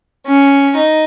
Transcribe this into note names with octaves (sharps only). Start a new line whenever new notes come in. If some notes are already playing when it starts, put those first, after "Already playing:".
C#4
D#4